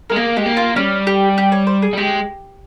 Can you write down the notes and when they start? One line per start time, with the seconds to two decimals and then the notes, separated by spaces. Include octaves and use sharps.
0.10 G#3 A#4
0.16 A#3 G#4
0.37 G#3 G4
0.46 A#3
0.57 F4
0.76 G3 C#4
1.07 G4
1.38 G4
1.52 C#5
1.67 C5
1.82 G#4
1.93 G3
1.97 G#3 G4